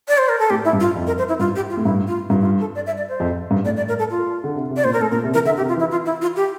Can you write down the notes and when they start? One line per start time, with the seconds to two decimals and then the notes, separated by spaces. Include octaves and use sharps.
0.08 D5
0.18 C5
0.29 A#4
0.39 A4
0.50 A2 G4
0.65 E4
0.73 G2
0.80 F4
0.96 F2
1.07 A#4
1.18 C5
1.29 E4
1.40 G2 F4
1.56 G4
1.70 F4
1.77 A2
1.85 G2 E4
2.08 F4
2.30 G2 F4
2.40 E4
2.45 F4
2.60 A4
2.75 D5
2.86 E5
2.97 D5
3.09 C5
3.20 F2
3.51 G2
3.65 A2 D5
3.77 D5
3.88 A#4
3.99 A4
4.10 F4
4.44 D3
4.56 C3
4.70 C3
4.77 D5
4.84 A#2 C5
4.93 A#4
5.00 A2 A4
5.11 A#2 A#4
5.24 C3
5.34 E3 A#4
5.45 D3 E5
5.57 G4
5.60 C3
5.68 F4
5.76 E3 E4
5.91 F4
6.06 E4
6.22 F4
6.36 G4